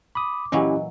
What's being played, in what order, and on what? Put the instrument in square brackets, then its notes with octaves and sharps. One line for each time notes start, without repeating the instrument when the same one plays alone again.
[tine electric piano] B5 D#6 [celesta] D6
[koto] A#2 E3 F#3 [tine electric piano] C#4 E4 G4 [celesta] D#5